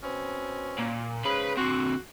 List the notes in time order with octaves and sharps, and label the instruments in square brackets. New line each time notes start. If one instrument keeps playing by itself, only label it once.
[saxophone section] B2 C4 C#4
[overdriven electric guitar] A#2
[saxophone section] G#2 C#3 [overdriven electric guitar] B4 B5
[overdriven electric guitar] D3 C4 [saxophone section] F#4